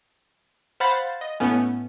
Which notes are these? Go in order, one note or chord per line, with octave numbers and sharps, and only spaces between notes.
C5 F5 F#5 B5 A6
D#5
A2 A3 B3 C#4